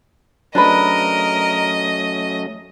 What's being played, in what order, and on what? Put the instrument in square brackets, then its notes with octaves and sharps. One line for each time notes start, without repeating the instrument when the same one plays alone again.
[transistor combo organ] F#3 A3 C#4 [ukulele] D4 G#4 B4 [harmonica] A#4 [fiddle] D#5